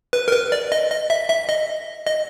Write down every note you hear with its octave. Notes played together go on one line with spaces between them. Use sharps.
B4
A#4
B4
D5
D#5
D#5
E5
E5
D#5
D#5